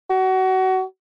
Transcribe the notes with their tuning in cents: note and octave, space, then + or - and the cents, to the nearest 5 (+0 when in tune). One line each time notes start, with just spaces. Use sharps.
F#4 +25